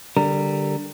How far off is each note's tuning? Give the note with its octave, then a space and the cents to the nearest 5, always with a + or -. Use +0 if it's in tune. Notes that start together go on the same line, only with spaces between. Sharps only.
D3 +0 G3 +0 A#4 -15